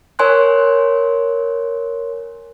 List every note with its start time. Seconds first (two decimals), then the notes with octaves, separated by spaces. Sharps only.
0.19 A#4 C#5 G#5 C6 F#6